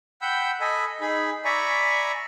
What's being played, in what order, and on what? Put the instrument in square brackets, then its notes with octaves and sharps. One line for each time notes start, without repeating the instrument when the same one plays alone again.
[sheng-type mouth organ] F#5 G5 B5 E6 G6
A4 D#5 G#5 B5
D#4 G#4 B5
D5 E5 G#5 A#5 B5 C#6